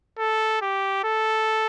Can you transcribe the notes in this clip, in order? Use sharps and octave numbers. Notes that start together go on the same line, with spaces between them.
A4
G4
A4